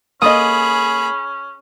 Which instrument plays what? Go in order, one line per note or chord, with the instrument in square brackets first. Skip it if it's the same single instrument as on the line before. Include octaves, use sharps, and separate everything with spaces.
[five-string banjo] A#3 A4 D#5 [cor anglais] C#4 [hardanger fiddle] G#4 B5 [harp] D#6